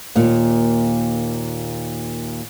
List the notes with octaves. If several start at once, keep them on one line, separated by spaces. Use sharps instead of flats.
D#2 A#2